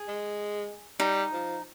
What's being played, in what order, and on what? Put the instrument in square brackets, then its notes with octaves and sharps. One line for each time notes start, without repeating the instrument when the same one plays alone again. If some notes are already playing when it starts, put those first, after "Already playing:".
Already playing: [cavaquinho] G#4
[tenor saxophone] G#3
[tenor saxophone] G3 [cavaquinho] D#4
[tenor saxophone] F3